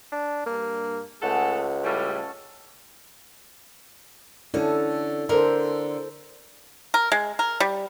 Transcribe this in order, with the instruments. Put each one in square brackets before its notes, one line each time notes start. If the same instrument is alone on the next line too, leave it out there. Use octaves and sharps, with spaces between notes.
[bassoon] D4
[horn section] G2 [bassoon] A#3
[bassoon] C#2 [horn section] A3 G#4 A4 [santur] F#5
[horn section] A2 C#3 G3 [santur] C#4 A4 E6
[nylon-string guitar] D3 C#4 [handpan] E4 A4
[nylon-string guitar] D3 A#4 [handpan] A4 C5
[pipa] A#4
G#3
A#4
G3